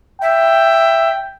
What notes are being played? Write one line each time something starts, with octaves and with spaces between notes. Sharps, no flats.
E5 G5